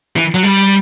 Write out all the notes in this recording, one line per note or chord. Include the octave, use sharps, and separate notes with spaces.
E3
F#3
G3